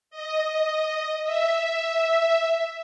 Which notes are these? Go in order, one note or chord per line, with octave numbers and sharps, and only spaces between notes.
D#5
E5